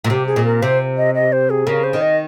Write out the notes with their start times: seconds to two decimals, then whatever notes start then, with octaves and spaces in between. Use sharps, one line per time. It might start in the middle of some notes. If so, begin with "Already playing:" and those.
0.04 A#2
0.10 C3 G4
0.27 G#4
0.36 A#2
0.45 A#4
0.62 C3 C5
0.97 D#5
1.15 D#5
1.32 C5
1.50 G#4
1.67 C#3 A#4
1.84 C5
1.93 D#3
2.01 D#5